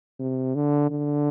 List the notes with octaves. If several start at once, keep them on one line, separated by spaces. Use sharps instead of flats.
C3
D3
D3